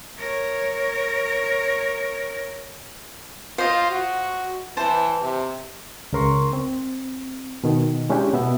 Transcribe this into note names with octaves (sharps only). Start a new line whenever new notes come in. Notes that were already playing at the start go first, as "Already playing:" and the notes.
A#4 C#5
F4 C5 D#5
F#4
E3 C5 A5
C3
C#2 C#3 A#4 C6 C#6
C4
B2 D#3
G#3 C#4 D4 E4 G4
B2 B3 E5